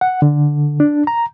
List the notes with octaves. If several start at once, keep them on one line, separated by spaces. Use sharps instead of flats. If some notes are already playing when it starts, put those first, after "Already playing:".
F#5
D3
D4
A#5